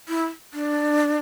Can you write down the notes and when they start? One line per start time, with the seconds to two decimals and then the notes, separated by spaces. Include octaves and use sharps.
0.09 E4
0.54 D4